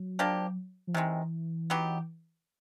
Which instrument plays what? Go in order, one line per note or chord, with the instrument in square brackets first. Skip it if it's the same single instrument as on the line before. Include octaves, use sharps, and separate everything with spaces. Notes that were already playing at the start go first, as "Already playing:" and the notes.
Already playing: [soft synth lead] F#3
[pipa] F3 A#3 D4 G4
[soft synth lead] F3
[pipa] C3 D#3 G#3 [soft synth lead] E3
[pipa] F#3 B3 D#4 G4